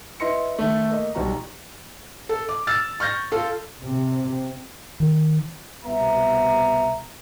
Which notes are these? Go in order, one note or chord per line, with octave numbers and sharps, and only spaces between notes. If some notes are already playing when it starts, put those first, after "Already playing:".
E4 B4 D#5 C6 A#6 C#7
D#3 A3
A#3 D#5
B1 G3 F#4 A#5
A4
D6
E6 F6 A6
C#6 F6 G6 A#6
F4 A4
C3
D#3
C2 B2 B3 E5 A#5